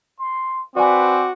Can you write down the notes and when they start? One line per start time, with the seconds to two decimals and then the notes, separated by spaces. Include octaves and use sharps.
0.19 C6
0.76 C4 F#4 B4 D5 G#5 D6